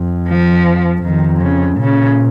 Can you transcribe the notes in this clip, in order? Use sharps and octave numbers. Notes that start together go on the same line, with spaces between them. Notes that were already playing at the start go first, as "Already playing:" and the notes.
Already playing: F2
F3
F2 D#3
C#3
A#2 C#3